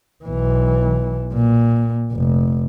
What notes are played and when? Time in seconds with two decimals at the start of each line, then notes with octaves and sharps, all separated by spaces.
0.24 B1 E3
1.33 A#2
2.12 F1